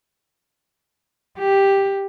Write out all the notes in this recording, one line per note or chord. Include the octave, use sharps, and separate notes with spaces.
G4